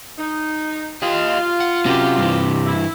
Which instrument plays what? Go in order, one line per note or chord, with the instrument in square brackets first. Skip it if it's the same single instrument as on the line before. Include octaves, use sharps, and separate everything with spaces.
[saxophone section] D#4
[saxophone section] F4 [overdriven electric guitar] G4 D#5
[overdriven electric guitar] F#5
[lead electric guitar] C3 G4 [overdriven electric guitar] C#4 F#4
[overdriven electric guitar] G2 E3
[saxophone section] E4